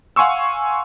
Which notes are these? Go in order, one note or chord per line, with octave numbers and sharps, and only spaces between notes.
F5 F#5 G#5 C6 C#6 E6